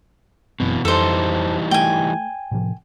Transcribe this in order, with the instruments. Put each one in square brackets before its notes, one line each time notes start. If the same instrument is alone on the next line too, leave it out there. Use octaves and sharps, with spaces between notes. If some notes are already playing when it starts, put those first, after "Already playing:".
[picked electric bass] F#1 F#2 C4 [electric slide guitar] B2 E3
[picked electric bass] F2 [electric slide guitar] E3 G3 D#4 [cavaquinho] A4 C5
[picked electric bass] A3 [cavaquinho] G5 G#5
[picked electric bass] A2 C3 F3